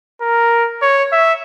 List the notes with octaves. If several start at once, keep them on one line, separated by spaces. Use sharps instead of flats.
A#4
C#5
E5